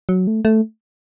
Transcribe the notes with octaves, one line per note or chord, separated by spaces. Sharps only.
F#3
A3
A3